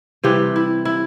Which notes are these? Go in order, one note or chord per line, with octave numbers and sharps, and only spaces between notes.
C3 E3 G3 G4
E4
E4